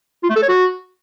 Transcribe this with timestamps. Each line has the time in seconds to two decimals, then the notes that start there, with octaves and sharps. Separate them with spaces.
0.23 F4
0.29 A3
0.36 A4
0.42 C#5
0.48 F#4